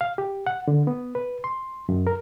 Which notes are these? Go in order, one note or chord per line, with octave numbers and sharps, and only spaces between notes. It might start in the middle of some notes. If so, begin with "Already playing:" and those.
F5
G4
F#5
D3
B3
B4
C6
F#2
A#4